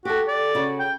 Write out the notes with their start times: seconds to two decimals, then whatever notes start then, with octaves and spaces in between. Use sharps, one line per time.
0.05 F#4 G4 A4
0.28 D5
0.55 C#3 F#4
0.79 G5